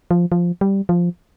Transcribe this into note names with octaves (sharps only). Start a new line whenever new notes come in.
F3
F3
G3
F3